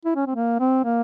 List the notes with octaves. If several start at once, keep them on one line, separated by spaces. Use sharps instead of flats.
E4
C#4
C4
A#3
C4
A#3